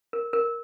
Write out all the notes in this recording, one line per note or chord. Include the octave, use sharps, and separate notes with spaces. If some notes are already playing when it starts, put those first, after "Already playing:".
A#4
A#4